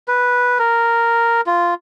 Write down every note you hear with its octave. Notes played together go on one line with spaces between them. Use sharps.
B4
A#4
F4